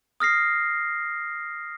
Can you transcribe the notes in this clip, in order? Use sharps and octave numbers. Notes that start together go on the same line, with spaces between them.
D#6 F6 A#6 C7